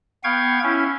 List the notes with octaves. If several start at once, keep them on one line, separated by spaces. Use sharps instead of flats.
B3 F5 G5 C#6 G#6
C#4 E4